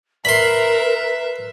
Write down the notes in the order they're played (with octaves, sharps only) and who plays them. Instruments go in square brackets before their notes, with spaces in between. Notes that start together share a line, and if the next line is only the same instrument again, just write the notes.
[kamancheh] A#4 [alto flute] B4 [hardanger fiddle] E5 [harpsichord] B5 C6